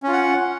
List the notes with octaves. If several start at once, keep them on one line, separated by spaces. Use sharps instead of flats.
C#4 F4 F#5